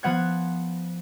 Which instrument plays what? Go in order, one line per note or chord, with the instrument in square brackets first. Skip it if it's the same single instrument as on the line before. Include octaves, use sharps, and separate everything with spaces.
[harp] F3 B3 F#5 G#6